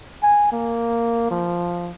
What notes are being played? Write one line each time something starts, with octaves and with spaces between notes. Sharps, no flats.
G#5
A#3
F3